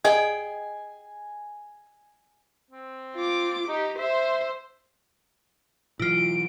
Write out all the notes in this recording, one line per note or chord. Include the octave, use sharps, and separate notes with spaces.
G#4 D#5 G5 G#5
C4
F4 D6
D#4 G4
C5 E5
B2 E3 F#3 E4 F4 D7